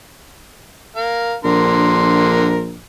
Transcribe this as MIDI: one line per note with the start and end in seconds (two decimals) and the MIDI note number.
0.96 1.35 70
0.96 1.35 77
1.45 2.79 34
1.45 2.69 50
1.45 2.69 70
1.45 2.69 84